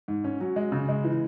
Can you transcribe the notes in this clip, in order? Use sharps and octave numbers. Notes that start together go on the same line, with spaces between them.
G#2
C#4
F#3
G#3
C#3
G#3
E3